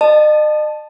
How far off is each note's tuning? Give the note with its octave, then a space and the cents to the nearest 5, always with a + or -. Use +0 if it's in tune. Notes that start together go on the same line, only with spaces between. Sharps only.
D#5 -40 A5 +0